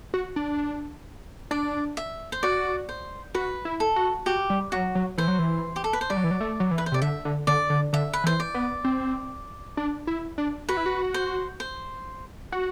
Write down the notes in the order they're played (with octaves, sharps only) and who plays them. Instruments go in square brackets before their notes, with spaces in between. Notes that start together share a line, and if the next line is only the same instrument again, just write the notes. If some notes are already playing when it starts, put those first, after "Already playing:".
[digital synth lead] F#4
D4
[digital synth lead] D4 [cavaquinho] D5
[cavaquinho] E5
C5
[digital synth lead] F#4 [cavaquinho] D5
[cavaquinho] C5
[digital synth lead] F#4 [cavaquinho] B4
[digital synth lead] E4
[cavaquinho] A4
[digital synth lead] F#4
[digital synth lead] F#4 [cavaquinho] G4
[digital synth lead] G3
[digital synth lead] F#3 [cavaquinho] F#4
[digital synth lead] F#3
[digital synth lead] E3 [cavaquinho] C5
[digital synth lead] F#3
E3
[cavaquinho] G4
A4
B4
C5
[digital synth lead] G3 [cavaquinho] D5
[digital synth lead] F#3
E3
F#3
A3
F#3
E3
[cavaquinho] B4
C5
[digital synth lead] C3 [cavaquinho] D5
[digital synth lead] D3 [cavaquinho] E5
[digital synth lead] D3
[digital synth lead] D3 [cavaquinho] D5
[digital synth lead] D3
[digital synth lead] D3 [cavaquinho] E5
[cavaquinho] B4
[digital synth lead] E3 [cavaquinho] C5
[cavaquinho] D5
[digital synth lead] B3
C4
D4
E4
D4
[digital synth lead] F#4 [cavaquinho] B4
[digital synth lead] E4
F#4
[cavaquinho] C5
C5
[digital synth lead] F#4